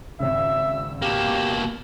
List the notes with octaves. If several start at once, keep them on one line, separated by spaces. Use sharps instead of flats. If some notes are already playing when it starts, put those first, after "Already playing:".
G#1 C#2 E5 E6
B2 A#3 G4 E7